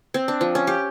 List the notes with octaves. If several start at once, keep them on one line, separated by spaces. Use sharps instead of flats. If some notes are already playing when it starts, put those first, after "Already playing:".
C4
D4
F3
C#4
G4